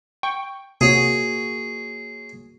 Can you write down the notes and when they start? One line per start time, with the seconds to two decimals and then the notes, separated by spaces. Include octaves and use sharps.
0.23 G5 C#6
0.81 C3 A#3 F#4 G#4 C#5